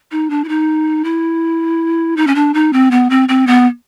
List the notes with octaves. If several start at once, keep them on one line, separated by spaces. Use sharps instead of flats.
D#4
D4
E4
D#4
E4
D#4
C#4
D4
D#4
C4
B3
C4
C4
B3